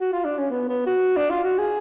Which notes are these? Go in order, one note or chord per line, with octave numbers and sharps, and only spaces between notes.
F#4
F4
D4
C#4
B3
B3
F#4
D4
F4
F#4
G#4